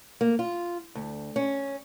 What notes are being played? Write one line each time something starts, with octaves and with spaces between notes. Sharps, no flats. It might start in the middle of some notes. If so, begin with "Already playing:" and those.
A#3
F4
D2
C#4